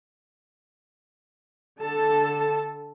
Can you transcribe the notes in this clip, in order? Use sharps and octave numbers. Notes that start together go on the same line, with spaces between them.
D3 A4 A5